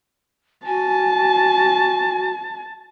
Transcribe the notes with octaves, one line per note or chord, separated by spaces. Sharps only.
F#4 G#5 A5